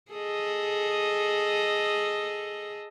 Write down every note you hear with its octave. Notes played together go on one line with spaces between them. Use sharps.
G#4 A4 D#5